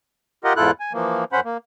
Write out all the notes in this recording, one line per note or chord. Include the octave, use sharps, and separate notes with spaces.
F4 G4 A#4 D#5 F#5
E2 G#2 E4 F4 A4 F#6
G#5
E3 F3 A#3
F#2 C#4 C5 F#5 B5
A#3